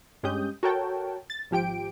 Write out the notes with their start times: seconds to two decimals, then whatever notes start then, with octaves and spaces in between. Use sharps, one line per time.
0.23 G2 G#3 C#4 G4 D#6 G6
0.63 F#4 A4 A#4 C#5 G5 A5
1.30 A6
1.51 G#1 F3 G4 G5 D7